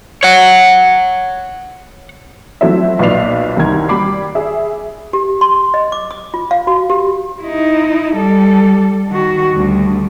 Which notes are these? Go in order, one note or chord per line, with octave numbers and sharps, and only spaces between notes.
C#5 F#5
F3 F#3 A3 C4 E4 E5
B1 A#2 B4 D5 C7 F7
C2 D#3 G3 A#4 G#6
G3 D5 B5 D6 C7
G#4 E5
G4
C6
D#5
D6
D#6
F4
F5
F#4
G4
D#4 E4
G3 A4
D#3 F#4
D2 G3